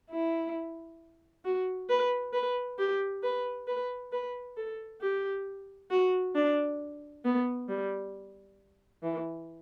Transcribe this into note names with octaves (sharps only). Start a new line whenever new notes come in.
E4
F#4
B4
B4
G4
B4
B4
B4
A4
G4
F#4
D4
B3
G3
E3